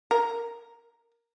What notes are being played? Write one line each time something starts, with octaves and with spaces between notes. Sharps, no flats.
A#4